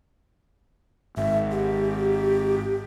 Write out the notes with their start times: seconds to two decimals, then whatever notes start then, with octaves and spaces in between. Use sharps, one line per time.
1.17 G#1 E5
1.51 G4